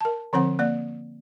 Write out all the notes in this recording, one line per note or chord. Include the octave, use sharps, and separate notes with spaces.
A#4 A5
D3 F3 C4 C5 F#5
A#3 D5